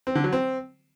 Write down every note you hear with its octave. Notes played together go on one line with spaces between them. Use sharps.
C4
D3
F#3
C4